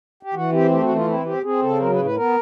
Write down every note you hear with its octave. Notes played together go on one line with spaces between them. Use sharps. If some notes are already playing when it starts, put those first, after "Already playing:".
G4
E3 F#4
C4 G4
A3 G4
F#4
E3
F4
C4 E4
C4 G4
C4 G#4
C#3 A4
F#3 A#4
B4
A2
B4
B3 A#4